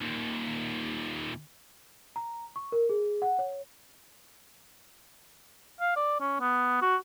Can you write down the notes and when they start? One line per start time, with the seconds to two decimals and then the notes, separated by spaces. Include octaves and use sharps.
0.01 D#2 A#2
2.16 A#5
2.56 C#6
2.72 A#4
2.89 G#4
3.22 F#5
3.39 C#5
5.81 F5
5.96 D5
6.20 C#4
6.40 B3
6.82 F#4